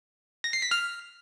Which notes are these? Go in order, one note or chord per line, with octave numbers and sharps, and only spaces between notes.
A#6
C7
B6
F6